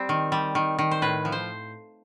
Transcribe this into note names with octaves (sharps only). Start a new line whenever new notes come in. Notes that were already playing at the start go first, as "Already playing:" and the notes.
Already playing: G3 C4
D#3
G3
D#3
D#3
C5
A2 B4
F3
C5